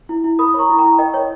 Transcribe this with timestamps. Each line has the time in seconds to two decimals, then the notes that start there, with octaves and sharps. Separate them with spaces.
0.09 E4
0.24 E4
0.39 A#4 B5 D#6
0.54 C#5 A#5 C#6
0.69 E4
0.79 G5 A#5
0.84 E4
0.99 A#4 D#5 G5
1.14 C#5